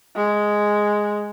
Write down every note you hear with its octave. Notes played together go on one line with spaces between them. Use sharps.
G#3